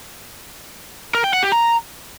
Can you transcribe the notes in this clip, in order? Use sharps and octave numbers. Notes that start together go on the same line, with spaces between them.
A#4
G5
F#5
G4
A#5